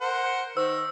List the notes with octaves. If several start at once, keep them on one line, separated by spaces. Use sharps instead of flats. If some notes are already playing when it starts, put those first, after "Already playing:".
A#4 C5 F#5
D#3 C5 E6